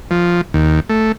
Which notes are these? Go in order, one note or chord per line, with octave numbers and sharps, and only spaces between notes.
F3
D#2
A3